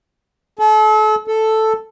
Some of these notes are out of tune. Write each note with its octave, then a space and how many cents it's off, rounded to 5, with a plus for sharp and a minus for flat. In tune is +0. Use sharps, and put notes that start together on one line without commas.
A4 -35
A4 +0